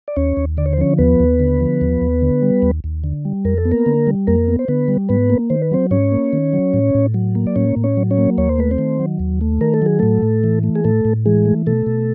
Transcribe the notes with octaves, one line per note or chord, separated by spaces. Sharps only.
D5
D#2 C#4 C#5
D#2
D3 D5
C#5
C5
F3 C#4 C#5
D#2 B3 B4
D#2
D3
F3
D#2
D#2
D3
G3
D#2
D#2
D3
G3
F2 A#4
A4
B3
A#3 A#4
D3
G3
F2 A#3 A#4
B3
C5
D3 B3 B4
G3
G#2 B3 B4
A#3
D#3 C5
B4
F#3 C4 C5
G#2 C#4 C#5
A#3
D#3
F#3
A2
A2
F#3
A#3
D5
A2 C#4 C#5
A2
C#4 C#5
F#3
C#4 C#5
A#3
D#2 C#5
C5
A3 B4
C4 C5
D#3
F#3
D#2
A3
D#3 A#4
A4
F#3 G#4
A2 A3 A4
A2
E3
A3
G#4
A2 A3 A4
A2
E3 G#3 G#4
A3
B2 A3 A4
B2